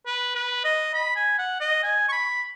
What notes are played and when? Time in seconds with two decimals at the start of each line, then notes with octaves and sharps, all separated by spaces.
0.06 B4
0.35 B4
0.65 D#5
0.94 B5
1.16 G#5
1.39 F#5
1.61 D#5
1.83 G#5
2.09 C#6
2.12 B5